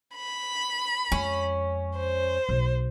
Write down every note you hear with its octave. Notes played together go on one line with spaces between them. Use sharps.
B5
F2 G#3 C#4
C5
B1